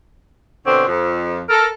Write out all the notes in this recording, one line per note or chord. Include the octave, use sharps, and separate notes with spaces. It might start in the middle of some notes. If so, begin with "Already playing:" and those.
B2 D3 C4 C#5
F2
A4 A#4